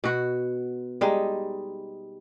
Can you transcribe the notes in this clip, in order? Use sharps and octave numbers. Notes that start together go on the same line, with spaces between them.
B2 F#4
G3 G#3 D#4